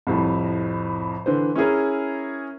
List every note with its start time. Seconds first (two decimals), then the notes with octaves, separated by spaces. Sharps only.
0.07 C2 F2 A2
1.26 D3 E3 C5
1.56 C#4 E4 G#4 A#4